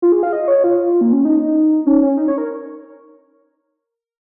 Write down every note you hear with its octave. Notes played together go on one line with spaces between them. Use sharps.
F4
G#4
F5
D#5
C#5
F4
A#3
C#4
D#4
C#4
C#4
D#4
C#5
A#4